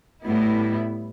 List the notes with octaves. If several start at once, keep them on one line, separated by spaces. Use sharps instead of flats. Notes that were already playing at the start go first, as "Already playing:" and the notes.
A2 G3 B3 E4